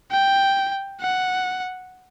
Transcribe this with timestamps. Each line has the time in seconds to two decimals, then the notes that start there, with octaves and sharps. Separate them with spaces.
0.11 G5
1.00 F#5